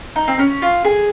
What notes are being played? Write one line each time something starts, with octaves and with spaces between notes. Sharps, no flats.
D#4
C4
C#4
F4
G#4